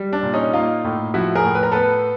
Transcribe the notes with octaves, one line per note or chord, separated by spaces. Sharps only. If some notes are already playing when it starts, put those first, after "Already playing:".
Already playing: G3
D4
A#2
C#4 D#4
A#3 D#4 F4
A2
F3 E4 F#4
G#4 A#4
A2
B4
A#4
B3 A4 B4